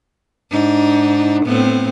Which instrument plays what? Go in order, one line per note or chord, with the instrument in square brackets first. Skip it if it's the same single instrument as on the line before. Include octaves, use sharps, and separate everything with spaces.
[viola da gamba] G#2 D4 D#4
A2 B3 C4